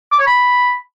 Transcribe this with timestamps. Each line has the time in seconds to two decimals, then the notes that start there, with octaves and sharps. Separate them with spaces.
0.12 D6
0.19 C#5
0.27 B5